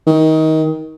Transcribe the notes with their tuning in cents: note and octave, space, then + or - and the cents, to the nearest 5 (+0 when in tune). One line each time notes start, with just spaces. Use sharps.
D#3 +25